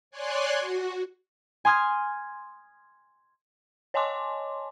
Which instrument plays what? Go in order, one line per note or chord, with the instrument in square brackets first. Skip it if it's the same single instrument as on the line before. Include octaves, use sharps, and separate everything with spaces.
[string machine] C#5 D5 G#5 C6 F#6
F#4
[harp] G#5 C6 D#6 F6 G#6
[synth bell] C#5 D#5 G#5 A5 C6 D6